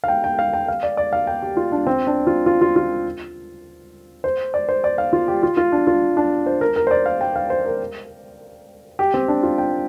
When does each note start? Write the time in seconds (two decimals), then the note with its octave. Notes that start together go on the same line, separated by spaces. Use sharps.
0.04 F5
0.08 G5
0.24 G5
0.39 F5
0.53 G5
0.68 F5
0.83 D5
0.97 D5
1.13 F5
1.27 G5
1.42 G4
1.57 F4
1.72 D4
1.87 C4
2.07 D4
2.27 F4
2.46 F4
2.62 F4
2.76 F4
4.24 C5
4.54 D5
4.69 C5
4.84 D5
4.98 F5
5.13 F4
5.28 G4
5.43 F4
5.57 F4
5.72 D4
5.87 F4
6.17 D4
6.46 C5
6.61 A#4
6.76 A#4
6.87 C5
6.91 D5
7.06 F5
7.21 G5
7.36 F5
7.50 C5
7.66 A#4
8.99 G4
9.14 C4
9.28 D4
9.43 F4
9.58 G5